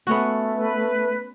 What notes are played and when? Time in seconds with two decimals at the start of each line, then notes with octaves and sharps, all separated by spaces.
0.07 A3 B3 C#4 F#4
0.55 B4